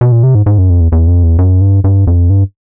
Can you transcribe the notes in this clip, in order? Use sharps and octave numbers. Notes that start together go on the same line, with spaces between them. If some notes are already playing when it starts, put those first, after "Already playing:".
B2
A#2
C3
G#2
G#2
F#2
F2
E2
E2
F2
E2
F#2
G2
G2
F2
G2